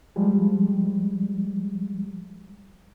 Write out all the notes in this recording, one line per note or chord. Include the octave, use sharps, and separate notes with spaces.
F3 G3 G#3